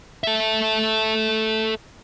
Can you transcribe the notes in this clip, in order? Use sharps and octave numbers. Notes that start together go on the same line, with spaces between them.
A4 E5